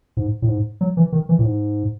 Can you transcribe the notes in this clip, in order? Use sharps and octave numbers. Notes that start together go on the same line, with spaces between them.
G#2
A2
G#2
F#3
E3
D#3
E3
A2
G#2